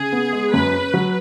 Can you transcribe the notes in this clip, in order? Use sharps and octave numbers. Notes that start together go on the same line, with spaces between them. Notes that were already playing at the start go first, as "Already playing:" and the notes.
Already playing: C#3 G#4
B3
G#3
F#2 B4
C#4
F#3